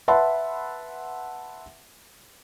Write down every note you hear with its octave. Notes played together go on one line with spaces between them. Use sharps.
B4 E5 F#5 A5 B5 C6